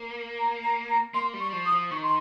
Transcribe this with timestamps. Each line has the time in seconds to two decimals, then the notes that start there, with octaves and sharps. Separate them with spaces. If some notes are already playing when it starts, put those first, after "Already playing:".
Already playing: A#3
0.38 A#5
0.63 A#5
0.89 A#5
1.14 A#3 C6
1.34 G3
1.40 C#6
1.53 F3
1.66 D#6
1.72 F3
1.91 D#3 C#6
2.02 C6